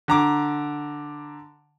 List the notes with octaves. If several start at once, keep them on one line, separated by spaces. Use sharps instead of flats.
D3 A#5 D6